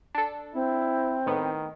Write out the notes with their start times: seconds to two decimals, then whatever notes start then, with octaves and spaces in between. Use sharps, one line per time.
0.15 D4 A4
0.54 C4 E4
1.27 A2 D#3 B3